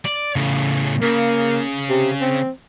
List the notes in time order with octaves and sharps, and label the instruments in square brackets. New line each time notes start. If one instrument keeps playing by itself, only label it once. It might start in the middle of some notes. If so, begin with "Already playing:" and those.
[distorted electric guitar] D5
A2 C#3
[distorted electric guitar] C#3 [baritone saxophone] A#3
[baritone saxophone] C3
C4